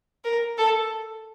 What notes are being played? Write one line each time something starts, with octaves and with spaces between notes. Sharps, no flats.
A#4
A4